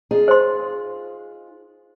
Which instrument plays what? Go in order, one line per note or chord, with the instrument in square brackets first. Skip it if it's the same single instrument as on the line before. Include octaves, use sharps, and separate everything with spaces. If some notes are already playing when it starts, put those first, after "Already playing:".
[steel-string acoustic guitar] D#4 F4 G#4
[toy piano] C5 C6